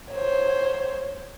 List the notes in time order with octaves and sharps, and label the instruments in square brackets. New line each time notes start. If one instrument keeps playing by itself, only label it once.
[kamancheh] C5 C#5